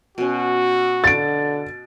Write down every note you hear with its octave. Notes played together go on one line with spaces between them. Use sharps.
B2 C#4 F#4
D3 A6 D7